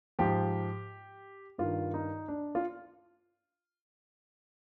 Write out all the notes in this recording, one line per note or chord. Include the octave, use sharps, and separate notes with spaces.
G#2 F3 G4
G2 D#3 F4
D#4
D4
F4